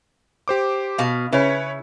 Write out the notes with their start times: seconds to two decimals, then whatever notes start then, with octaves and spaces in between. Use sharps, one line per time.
0.48 G4 C5 D6
0.98 B2 F5
1.33 C#3 E4 B4 C#5